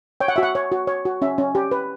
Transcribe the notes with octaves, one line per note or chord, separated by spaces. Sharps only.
C#5 G5
F#5
F#4 E5
F#5
C#5
F#4
C#5
F#4
C#4 E5
C#4
G4
B4